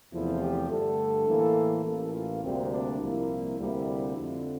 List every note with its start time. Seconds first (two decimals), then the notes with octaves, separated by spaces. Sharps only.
0.13 E2 C3 F3 A3 E4
0.41 G4
0.70 G2 D3 A3 A4
1.27 A2 E3 A#3
1.85 A1 A2 E3 A#3 A4
2.13 F4
2.42 D2 C3 G3 A#3 C4
2.71 D4
3.00 C2 A#2 F3 A#3 E4
3.57 D2 C3 G3 A#3
4.14 F2 D3 F3